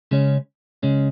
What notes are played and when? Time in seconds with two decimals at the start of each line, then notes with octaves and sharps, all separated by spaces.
0.11 C#3 G#3 C#4
0.83 C#3 G#3 C#4